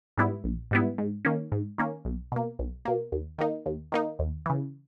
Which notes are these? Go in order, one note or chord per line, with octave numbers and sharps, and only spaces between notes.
G#2 G3 B3 E4
A#1
G#2 G3 B3 E4
G#2
D#3 A#3 C#4
G#2
D#3 A#3 C#4
B1
B2 A#3
B1
B2 A#3
D#2
D#3 A#3 D#4
D#2
D#3 A#3 D#4
D#2
C#3 E3